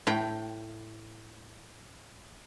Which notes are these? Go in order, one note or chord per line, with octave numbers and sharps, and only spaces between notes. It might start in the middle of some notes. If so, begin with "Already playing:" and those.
A2 G5